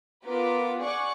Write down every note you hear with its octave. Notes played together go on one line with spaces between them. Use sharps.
B3 F4 A#4 B4 D6
G#4 D5 F#5 C#6 D6 F#6